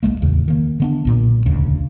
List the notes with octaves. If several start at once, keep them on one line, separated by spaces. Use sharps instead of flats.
B1 G2 G#3 A#3
D1 E2 C#3
D#3 A#3
D3 B3 D4
B1 A#2
E1 D2 C#3